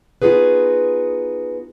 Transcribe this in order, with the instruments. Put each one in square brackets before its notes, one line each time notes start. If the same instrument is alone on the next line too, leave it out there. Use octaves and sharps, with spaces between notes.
[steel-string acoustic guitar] B3 D#4 F4 F#4 G#4 B4